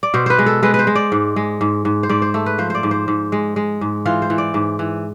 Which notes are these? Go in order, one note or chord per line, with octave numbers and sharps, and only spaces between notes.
D5
B2 C5
B4 C5
G#3
A4
G#3 B4
B4
C5
G#3
D5
G#2
G#3
G#2
G#2
C5
G#2 D5
C5
A3 A4
B4
F3 C5
C5 D5
G#2
C5
G#2
G#3
G#3
G#2
E3 F4
C5
E3
D5
G#2
E3